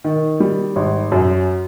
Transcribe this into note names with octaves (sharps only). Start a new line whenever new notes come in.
D#3
G3
G#1
F#2